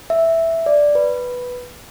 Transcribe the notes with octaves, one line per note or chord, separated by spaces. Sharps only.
E5
D5
B4